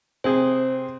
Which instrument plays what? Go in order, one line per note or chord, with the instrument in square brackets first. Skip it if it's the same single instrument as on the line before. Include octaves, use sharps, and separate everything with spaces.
[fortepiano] C3 C4 G#4 [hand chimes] C5